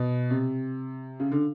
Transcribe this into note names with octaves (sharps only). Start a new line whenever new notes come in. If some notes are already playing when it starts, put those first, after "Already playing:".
Already playing: B2
C3
C#3
D3